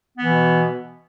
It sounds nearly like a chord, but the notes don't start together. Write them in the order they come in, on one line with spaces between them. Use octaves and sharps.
B3 E3 B2